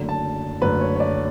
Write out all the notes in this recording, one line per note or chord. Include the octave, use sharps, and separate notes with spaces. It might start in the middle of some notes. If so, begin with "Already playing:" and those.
Already playing: F#1 F#2 D3 A3
A5
F#1 F#2 D3 A3 B4
C#5
C#5
D5